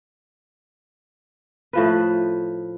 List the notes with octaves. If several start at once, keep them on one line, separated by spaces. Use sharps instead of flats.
A2 F3 B4